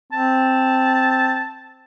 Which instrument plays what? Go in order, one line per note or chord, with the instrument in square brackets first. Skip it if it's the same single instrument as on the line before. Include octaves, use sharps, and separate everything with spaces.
[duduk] C4 [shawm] A5